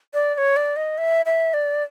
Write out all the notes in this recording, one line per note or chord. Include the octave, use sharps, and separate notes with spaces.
D5
D5
C#5
D5
D#5
E5
E5
D5